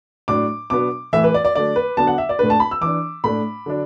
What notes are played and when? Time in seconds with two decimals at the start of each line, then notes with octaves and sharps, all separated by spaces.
0.28 A2 F#3 D4 D6
0.70 B2 F#3 B3 D4 D6
1.13 A2 E3 A3 E5
1.24 B4
1.34 D5
1.45 D5
1.55 D3 F#3 A3 D4 D5
1.76 B4
1.97 D3 F#3 B3 D4 A5
2.07 F#5
2.18 E5
2.29 D5
2.39 A2 A3 D4 B4
2.50 A5
2.60 B5
2.71 E6
2.81 E3 D4 D6
3.24 A2 A3 D4 B5
3.66 D3 F#3 D4